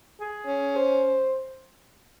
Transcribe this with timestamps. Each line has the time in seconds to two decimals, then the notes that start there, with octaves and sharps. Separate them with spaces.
0.19 G#4
0.47 C#4
0.75 C5